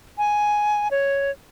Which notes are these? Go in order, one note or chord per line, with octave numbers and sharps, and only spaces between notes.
G#5
C#5